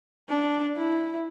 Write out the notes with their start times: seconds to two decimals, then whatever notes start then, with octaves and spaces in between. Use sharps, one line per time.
0.29 D4
0.76 E4